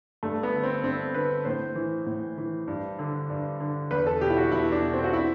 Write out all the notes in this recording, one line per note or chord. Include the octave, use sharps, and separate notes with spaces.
G2 A3
B3
D3
C4
G2 C4
D3 B4
A2 C5
E3
A2
E3
G2
D3
G2
D3
E2 B4
A4
B2 G4
E4
F#4
E2 E4
D4
B2
C4
F#4
E4